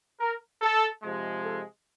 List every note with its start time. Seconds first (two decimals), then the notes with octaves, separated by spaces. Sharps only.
0.20 A#4
0.62 A4
1.03 C3 F3 G#3
1.44 A4